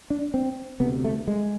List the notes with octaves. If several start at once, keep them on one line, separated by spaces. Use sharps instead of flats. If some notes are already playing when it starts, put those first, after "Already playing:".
D4
C4
D2 C3 B3
A3
G#3